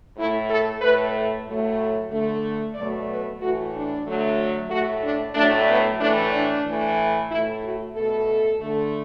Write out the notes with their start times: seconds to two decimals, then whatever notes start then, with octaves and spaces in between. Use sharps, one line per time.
0.16 A2 A3 E4
0.48 A4
0.81 A2 A3 B4
1.45 A2 F#3 A3
2.10 D3 A3
2.75 B2 F#3 A3 D5
3.08 B4
3.40 A2 E3 A3 F#4
3.72 D4
4.06 D3 F#3 A3
4.69 A3 F#4
4.74 A2
5.02 D4
5.34 A2 F#3 A3 D4
5.67 B3
5.99 A2 E3 A3 D4
6.33 D4
6.64 A2 E3 A3
7.30 A2 A3 E4
7.62 F#4
7.94 B2 A3 A4
8.60 D3 A3